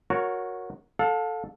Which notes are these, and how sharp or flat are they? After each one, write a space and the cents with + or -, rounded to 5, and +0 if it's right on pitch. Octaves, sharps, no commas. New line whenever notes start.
F#4 -15 A#4 +0 C#5 +10
A4 +0 F5 +40